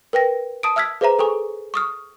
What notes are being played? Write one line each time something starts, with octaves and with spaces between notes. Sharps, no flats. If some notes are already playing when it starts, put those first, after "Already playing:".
A#4 B4 G5 A#6
A5 D#6 D7
E5 E6 F6 G#6 B6
G#4 B4 C5 E5 A#5
G#4 A4 G#5 C#6
C#6 D#6 F6